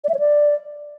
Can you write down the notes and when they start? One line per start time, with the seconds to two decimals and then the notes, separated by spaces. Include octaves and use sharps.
0.04 D5
0.09 E5
0.14 C#5
0.19 D5